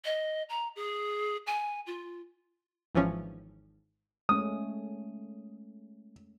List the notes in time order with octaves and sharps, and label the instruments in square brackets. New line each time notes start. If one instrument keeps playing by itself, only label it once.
[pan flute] D#5
A#5
G#4
G#5
F4
[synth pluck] G#1 E3 F3 C#4
[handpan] G#3 A3 C#4 [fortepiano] D#6